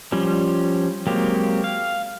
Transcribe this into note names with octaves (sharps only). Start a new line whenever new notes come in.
F3 G3 C#4
F#3 G#3 A#3 C4 G4
F5